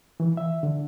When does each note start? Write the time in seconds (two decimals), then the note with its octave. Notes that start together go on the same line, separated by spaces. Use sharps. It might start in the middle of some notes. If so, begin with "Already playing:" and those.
0.20 E3
0.37 E5
0.63 D3